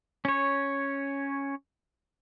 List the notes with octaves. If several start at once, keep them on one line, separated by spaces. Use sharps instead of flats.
C#4 C#5